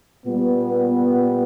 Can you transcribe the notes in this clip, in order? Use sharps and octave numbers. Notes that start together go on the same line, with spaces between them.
A#2 G3 B3